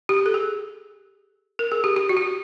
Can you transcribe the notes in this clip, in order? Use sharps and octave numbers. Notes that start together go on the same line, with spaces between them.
G4
A4
G#4
A#4
G#4
G4
G4
F#4
G4
F#4